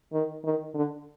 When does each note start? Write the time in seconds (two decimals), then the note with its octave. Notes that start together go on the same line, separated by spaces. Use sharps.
0.13 D#3
0.44 D#3
0.74 D3